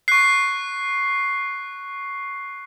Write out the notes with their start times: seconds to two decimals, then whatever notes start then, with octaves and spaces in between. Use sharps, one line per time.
0.08 C#6 F#6 C7